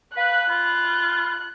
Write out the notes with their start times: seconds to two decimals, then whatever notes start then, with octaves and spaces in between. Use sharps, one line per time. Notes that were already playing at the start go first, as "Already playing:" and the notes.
0.17 B4 F5 F#6
0.49 F4 B5